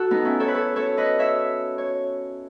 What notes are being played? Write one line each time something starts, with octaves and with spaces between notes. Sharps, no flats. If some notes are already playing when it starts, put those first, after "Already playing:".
Already playing: F#4 A4
B3 D#4
C#4 E4
A4 C#5
B4
A4 C#5
A4 C#5
B4 D#5
C#5 E5
C#5